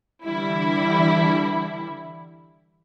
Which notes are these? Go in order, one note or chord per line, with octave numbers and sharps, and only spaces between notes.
D3 E3 G3 E4